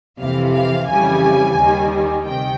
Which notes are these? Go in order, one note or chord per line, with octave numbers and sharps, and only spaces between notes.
F2 C3 E3 F5
F5
F2 C#3 E3 G3 G#5
D#2 D#3 G3
D2 C3 D#3 G5